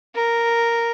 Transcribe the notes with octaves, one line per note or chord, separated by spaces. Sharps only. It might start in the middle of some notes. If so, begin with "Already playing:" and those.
A#4